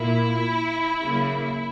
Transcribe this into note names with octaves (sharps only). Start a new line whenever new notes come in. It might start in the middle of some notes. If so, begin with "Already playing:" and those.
Already playing: A#2 A#3 E4
C#3 F#3 A#3